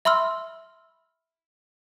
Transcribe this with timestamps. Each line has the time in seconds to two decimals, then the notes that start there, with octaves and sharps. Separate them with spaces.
0.05 E5 B5 C6 E6 F6